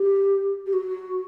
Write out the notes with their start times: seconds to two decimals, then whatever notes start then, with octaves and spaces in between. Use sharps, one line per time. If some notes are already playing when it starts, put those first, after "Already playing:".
Already playing: G4
0.66 G4
0.73 F#4